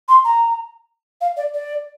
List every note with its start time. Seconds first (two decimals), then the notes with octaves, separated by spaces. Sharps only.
0.08 C6
0.24 A#5
1.21 F5
1.37 D5
1.54 D5